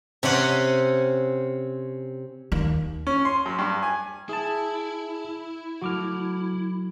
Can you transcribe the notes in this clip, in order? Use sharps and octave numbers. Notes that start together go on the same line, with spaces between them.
C3 C4 C#4 F#5
D#2
C#4
C6
F#2
G2
G#5
E4 G#4 A5
F#3 A3 F#4 D6 F6